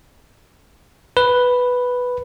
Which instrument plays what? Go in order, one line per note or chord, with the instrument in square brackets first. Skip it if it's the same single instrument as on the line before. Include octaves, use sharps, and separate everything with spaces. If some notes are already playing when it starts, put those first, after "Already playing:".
[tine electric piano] B4